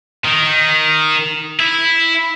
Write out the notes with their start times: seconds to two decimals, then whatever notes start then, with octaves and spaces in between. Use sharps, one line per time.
0.25 D#3
1.60 E4